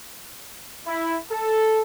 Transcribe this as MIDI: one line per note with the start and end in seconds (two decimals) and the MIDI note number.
0.87 1.17 64
1.31 1.81 69